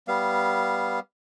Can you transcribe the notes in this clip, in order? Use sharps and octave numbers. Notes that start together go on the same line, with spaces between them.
G3 B3 F5